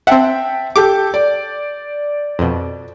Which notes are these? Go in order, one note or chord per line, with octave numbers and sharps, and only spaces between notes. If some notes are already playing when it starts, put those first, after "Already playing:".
C4 E5 F#5 G5 A5
G4 A4 D6 G6
D5
F2 B2